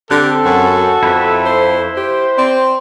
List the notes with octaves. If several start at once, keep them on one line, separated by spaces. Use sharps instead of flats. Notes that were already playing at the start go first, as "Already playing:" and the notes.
D3 C4 G4 A4 F#6
F#2 F#4
F2 E4 B4 E5
C5
G4 C5
C4 D5